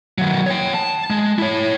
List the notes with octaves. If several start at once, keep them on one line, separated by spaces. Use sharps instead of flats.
D#3 F#3
C#5 G5
A5
G#3
E4 C#5